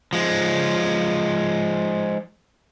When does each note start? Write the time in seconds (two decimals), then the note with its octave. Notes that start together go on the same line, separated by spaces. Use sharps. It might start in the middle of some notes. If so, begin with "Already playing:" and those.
0.13 F3 G#3